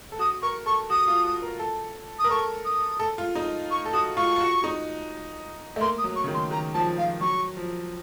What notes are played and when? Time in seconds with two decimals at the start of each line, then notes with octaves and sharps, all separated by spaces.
0.12 A4
0.19 F#4 D#6
0.42 A#4 C#6
0.66 A4 C#6
0.90 F#4 D#6
1.08 F4
1.25 F#4
1.42 A#4
1.59 A4
2.19 D#6
2.24 A#4
2.30 A4 C#6
2.65 D#6
3.00 A4
3.18 F4
3.35 D#4
3.71 C#6
3.85 A4
3.93 F#4 D#6
4.17 F4 C#6
4.36 F4
4.41 F#4
4.64 D#4
5.76 A3
5.81 A#3 C6
5.98 D#6
6.04 F#3
6.16 C#6
6.24 C#3
6.28 D#3
6.34 C6
6.51 D#3 A#5
6.74 F3 A5
6.98 F3 F5
7.21 F#3 C#6
7.57 F3